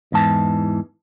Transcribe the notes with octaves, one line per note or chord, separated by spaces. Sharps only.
E2 G#2 E3 A5